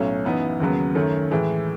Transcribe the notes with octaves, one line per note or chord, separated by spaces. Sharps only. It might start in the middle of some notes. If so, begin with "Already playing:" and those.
Already playing: B1 A2 F#3 A3 C#4
F#2 E3 B3 D#4
D#2 C#3 F#3 B3
F#2 D#3 A3 C#4
A2 E3 G#3